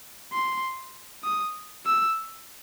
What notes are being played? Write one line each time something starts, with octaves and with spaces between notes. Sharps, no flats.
C6
D#6
E6